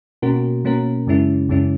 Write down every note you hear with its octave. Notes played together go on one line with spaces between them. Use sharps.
B2 A#3 C#4 F#4 A#4
B2 A#3 C#4 F#4 A#4
F#2 C#3 G#3 C#4 E4
F#2 C#3 G#3 C#4 E4